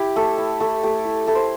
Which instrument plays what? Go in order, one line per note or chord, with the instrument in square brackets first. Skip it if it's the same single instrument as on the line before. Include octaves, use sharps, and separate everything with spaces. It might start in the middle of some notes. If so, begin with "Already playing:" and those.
Already playing: [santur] E4 G4
A3 A4
E4
A3 A4
A3 G4
E4
E4 A4
C5